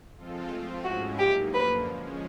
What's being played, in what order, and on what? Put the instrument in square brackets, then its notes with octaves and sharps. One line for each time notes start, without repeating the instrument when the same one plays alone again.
[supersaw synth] F3 G#3 C4 F4 A4
F3 A3 C4 F4
[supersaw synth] G#2 F3 G#3 C#4 E4 [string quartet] F#4
[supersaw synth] A2 F#3 A#3 D#4 [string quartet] G4
[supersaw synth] F#2 D3 F3 A#3 [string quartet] B4
[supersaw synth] F3 G#3 C#4